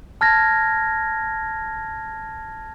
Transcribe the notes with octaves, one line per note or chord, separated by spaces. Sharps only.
A5 F6 G#6 A#6